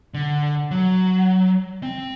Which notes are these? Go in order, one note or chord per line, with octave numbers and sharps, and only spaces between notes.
D3
F#3
C4